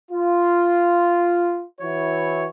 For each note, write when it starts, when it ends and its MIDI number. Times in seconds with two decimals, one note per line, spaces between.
0.11 1.64 65
1.81 2.45 52
1.81 2.45 64
1.81 2.45 66
1.81 2.45 73